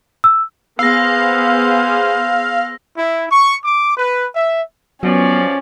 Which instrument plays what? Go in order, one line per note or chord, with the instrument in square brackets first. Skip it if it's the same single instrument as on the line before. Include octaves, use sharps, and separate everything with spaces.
[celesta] E6
[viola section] B3 G#4 C5 [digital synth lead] F5 [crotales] E6 A#6
[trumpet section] E4
C#6
D6
B4
E5
[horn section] B2 F3 D5 [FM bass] F#3 [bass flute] B3 [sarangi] C#4